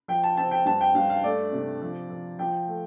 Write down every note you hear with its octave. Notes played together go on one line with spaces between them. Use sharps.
F3 G5
A5
C4 A5
G5
G2 A5
G5
G2 F5
F5
A3 D5
C3
F3
F3
F3 G5
A3